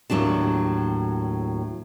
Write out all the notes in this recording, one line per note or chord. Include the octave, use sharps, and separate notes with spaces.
D#2 A2 F#3 D4 A5